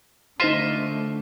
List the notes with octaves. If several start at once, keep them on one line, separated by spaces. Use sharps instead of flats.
D3 A3 D#4 F4 C5 D#5 E5 C6